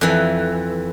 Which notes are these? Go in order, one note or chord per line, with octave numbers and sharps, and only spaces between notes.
F2 E3